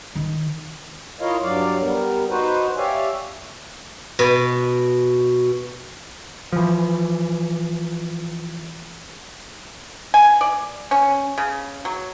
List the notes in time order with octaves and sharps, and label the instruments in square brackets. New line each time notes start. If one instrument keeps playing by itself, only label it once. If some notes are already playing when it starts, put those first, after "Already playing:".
[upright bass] D#3
[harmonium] E4 F4 A#4 C#5 D#5 F5
G2 F#3 D5 F5
G3 B3 A#4
D#4 F#4 B4 C5
G4 C#5 D5 E5 F5 G#5
[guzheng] B2
[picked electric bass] E3 F3
[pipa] G#5
D5
C#4
C#3
F#3